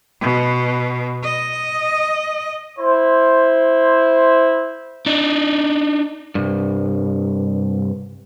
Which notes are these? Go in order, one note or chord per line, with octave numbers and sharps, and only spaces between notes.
B2
D#5
E4 C5
D4 D#4
C2 G2